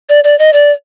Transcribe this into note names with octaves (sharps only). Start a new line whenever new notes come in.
D5
D5
D#5
D5